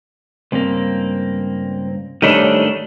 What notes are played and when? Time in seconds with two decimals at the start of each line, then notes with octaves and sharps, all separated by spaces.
0.52 C#2 G2 A#3 C4
2.22 G#2 D#3 G3 A3 D4 C#5